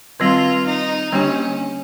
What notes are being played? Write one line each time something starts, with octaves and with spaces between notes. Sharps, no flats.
D#3 G3 C4 F4
D#4
D3 G3 A#3 C#4 D4 G4